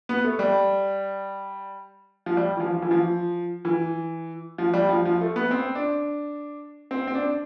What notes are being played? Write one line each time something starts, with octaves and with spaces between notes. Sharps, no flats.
B3
A3
G3
F3
G3
E3
F3
F3
E3
F3
E3
F3
G3
F3
F3
A3
B3
C4
D4
C4
C4
D4